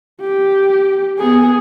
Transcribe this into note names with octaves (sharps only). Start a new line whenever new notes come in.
G4
B3 G#4